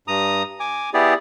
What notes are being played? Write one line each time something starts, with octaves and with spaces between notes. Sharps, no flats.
G2 A#5 D#6
G#5 D6
B3 E4 G4 G#4 D5